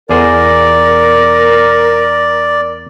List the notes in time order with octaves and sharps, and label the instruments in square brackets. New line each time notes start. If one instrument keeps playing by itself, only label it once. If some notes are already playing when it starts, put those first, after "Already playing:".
[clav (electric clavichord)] E2 G#4 C5 [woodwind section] A#4 [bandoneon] D5